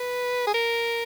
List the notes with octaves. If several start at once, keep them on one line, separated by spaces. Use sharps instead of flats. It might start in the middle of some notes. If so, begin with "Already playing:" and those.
Already playing: B4
G#4
A#4